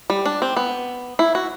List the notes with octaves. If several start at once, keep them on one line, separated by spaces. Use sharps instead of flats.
G3
D4
C4
B3
E4
F#4